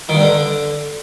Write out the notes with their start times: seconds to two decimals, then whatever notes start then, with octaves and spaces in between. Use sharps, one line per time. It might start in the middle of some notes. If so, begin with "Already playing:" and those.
0.09 D#3
0.15 G2
0.21 D3